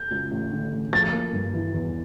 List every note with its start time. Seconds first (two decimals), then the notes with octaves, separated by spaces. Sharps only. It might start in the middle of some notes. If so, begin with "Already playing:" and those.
Already playing: G6
0.11 C#2
0.31 A1
0.51 D3
0.72 A1
0.92 F3 A6
1.12 A#3
1.33 G2
1.54 E3
1.74 E2